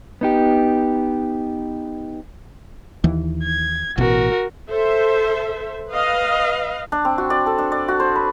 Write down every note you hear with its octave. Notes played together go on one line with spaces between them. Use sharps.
B3 D#4 G4
D#2 E3
G#6
A1 B2 F#4 A#4
A4 C5 E5
B4 D#5 F5
D4
C4
F#4
D5
A4
D4
D5
F#4
C5
B4